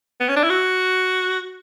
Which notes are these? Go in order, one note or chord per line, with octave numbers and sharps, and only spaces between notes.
B3
C#4
D4
E4
F#4